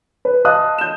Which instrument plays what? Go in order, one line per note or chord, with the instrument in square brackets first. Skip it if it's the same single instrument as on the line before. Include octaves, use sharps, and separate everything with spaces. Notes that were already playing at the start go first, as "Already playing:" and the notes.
[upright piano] B4
D#5 F5 A5 D#6 F#6
G6 E7